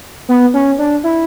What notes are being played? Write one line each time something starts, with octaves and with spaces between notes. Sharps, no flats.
B3
C#4
D4
E4